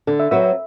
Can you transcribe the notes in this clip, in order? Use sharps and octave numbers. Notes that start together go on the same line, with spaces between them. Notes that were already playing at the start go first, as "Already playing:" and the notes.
D3 A4
E5
F#3 C4 F#4 B4 E5
E5